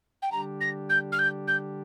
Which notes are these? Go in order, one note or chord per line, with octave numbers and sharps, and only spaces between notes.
G5
D3 G3 D4 G4 A#5
A#6
G6
F6
G6
G6